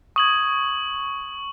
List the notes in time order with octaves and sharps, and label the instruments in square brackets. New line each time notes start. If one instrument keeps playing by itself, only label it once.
[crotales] C#6 F#7 [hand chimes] D#6 G#6